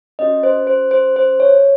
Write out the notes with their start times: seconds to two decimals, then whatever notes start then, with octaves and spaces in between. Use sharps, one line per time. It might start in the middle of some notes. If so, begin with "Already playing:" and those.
0.19 C#4 F#4 D#5
0.43 C5
0.67 C5
0.91 C5
1.16 C5
1.40 C#5